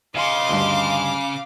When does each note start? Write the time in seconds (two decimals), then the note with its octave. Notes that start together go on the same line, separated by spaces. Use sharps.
0.15 C#3 D#5 F5 C6 D6
0.49 D2 G2